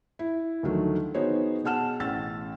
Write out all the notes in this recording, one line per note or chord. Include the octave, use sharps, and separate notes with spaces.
E4
D2 D#3 F3 F#3 A3
B3 D#4 F#4 G#4 C5 C#5
B2 G#4 F#5 A5 F6 E7
A1 C#4 E6 A6